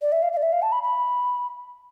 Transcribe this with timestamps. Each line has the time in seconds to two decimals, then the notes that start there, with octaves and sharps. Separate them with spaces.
0.02 D5
0.12 E5
0.22 F5
0.33 F5
0.37 D5
0.42 E5
0.52 F5
0.62 A5
0.72 B5
0.83 B5